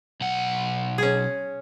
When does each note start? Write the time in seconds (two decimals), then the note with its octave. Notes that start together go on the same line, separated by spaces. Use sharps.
0.21 B1 F#5
0.98 C#4 G#4